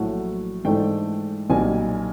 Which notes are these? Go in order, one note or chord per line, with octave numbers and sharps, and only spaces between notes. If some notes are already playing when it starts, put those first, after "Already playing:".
Already playing: A#1 A2 F#3 A3 F#5
G#2 E3 A3 D4 G5
B1 A#2 G3 G#5